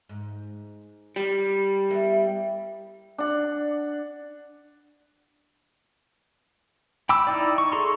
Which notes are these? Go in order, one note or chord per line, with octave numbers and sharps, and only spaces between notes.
G#2
G3
B3 E4 A#4
D4 F#5
G5 B5 D6 E6
D#4 E4 D5
C#6
G#4 A4 A#5 C6 C#6